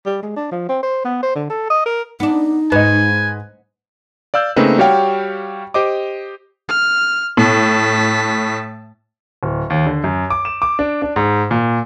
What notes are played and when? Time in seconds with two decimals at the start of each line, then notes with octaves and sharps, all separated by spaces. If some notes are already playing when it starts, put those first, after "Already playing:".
0.06 G3
0.23 G#3
0.37 D4
0.52 F3
0.69 C4
0.83 C5
1.05 B3
1.23 C5
1.36 D3
1.50 A4
1.70 D#5
1.86 A#4
2.20 B3 D4 D#4
2.72 G#2 B4 D#5 G#5
4.34 D5 F5 E6 G6
4.56 C#3 A3 A#3 C4 D#4 B4
4.78 G3 F#4 G4 C#5 F5 G5
5.74 G4 C5 D#5 D6
6.68 F6
7.37 A2 A5 B6
9.43 D1
9.70 D#2
9.87 D3
10.04 F#2
10.30 D6
10.45 E7
10.62 D6
10.79 D4
11.02 D4
11.16 G#2
11.51 A#2